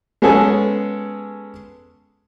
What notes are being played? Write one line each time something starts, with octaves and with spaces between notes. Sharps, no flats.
G#3 B3 C#4 G#4 A4